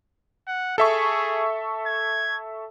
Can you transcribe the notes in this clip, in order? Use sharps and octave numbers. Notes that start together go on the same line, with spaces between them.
F#5
G#4 A4 E5 C#6
G#6